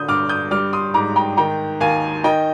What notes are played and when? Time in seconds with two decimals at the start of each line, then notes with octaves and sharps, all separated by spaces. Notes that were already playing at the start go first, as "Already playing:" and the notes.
Already playing: D3 D#6 G6
0.08 G2 D6 F6
0.29 D#6 G6
0.51 G3 D6 F6
0.73 C6 D#6
0.94 G#2 A#5 D6
1.16 G5 A#5
1.37 D#3 G5 A#5
1.80 D#2 F5 G#5
2.24 D#3 D#5 G5